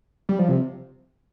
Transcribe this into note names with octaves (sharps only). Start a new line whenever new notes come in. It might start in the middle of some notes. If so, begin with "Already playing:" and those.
G3
F3
C3